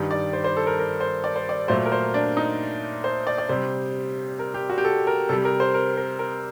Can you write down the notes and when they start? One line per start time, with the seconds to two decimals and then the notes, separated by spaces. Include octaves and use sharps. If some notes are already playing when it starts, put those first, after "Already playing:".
Already playing: G2 D#3 G3
0.11 D5
0.33 C5
0.44 C5
0.57 A4
0.67 A#4
0.79 A#4
1.00 C5
1.24 D5
1.36 C5
1.49 D5
1.68 A#2 F#3 A3 C5
1.85 A#4
1.92 C5
2.14 D4
2.37 D#4
3.04 C5
3.27 D5
3.38 D5
3.49 C3 G3 C5
4.39 A#4
4.54 G4
4.70 F#4
4.78 G4
4.85 A4
5.07 A#4
5.29 C3 G3 A4
5.45 A#4
5.60 C5
5.74 A#4
5.97 A#4
6.19 A#4